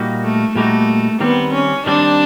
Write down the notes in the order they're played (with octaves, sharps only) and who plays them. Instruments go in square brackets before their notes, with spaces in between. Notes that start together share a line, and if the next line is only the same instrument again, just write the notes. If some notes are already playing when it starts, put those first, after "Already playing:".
Already playing: [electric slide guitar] A#2 G3 A#3 D#4 F#4
[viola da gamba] A3
[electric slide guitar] A#2 G3 A#3 D#4 F#4 [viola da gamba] A3
[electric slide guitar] D#3 G3 C4 [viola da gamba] B3
[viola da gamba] C#4
[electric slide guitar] D#3 G3 C4 [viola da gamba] D4